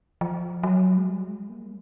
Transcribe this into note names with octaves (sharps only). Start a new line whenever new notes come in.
F3
F#3
G#3
G3
G#3
A#3